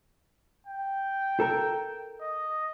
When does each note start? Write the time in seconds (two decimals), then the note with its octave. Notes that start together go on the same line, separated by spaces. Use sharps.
0.67 G5
1.40 A4 A#4
2.21 D#5